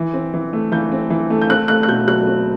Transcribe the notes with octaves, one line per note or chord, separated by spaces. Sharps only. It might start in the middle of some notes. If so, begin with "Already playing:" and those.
Already playing: E3
C4
E3
A3
E3 G6
C4
E3
A3
G6
C4 F#6
A3 F#6
F#6
B2 G6
F#3 F#6
C4